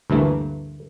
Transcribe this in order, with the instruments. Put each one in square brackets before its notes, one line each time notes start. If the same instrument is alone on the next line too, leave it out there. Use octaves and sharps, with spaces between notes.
[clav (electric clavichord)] D2 G2 E3 A3 A#3